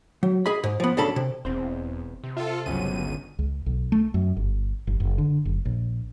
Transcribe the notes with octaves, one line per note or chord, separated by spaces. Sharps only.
F#3
G#4 D#5 B5
G#2
F3 B3
B1 C#3 D4 A4 B5
C3
E1 E2 C4 C5
C3
F4 A4 E5
G1 C#2 C#3 F#3 D#7
C#2
B1
A3
F#2
G1
G1
F#1
D3
F#1
A#1